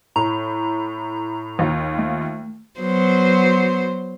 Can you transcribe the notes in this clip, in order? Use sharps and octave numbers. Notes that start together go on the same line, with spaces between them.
A2 A#5
D#2 F4
A3
F#3 B3 C5